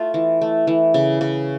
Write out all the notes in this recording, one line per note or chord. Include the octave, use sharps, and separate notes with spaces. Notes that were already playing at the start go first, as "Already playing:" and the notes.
Already playing: A3 F4
E3
A3
E3
C#3
C#3